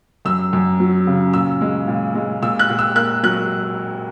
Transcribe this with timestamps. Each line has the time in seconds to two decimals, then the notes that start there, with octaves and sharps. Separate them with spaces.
0.25 F#2 E6
0.53 F#2
0.80 F#3
1.07 C#3
1.33 A#2 E6
1.61 G#3
1.87 A#2
2.15 G#3
2.42 A#2 E6
2.59 F#6
2.70 A#2
2.79 E6
2.95 A#3 F#6
3.23 F#3 F#6